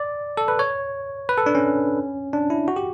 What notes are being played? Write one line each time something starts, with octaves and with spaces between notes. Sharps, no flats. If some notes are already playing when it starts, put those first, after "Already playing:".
Already playing: D5
A4
B4
C#5
B4
A4
D4
C#4
D4
E4
F#4
G4